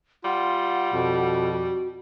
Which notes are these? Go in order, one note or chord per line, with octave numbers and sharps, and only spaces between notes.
G3 F4 F#5
F2 B2
F#4